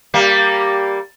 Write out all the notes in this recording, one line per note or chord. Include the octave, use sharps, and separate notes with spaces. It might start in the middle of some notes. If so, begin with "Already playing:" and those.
G3 A#3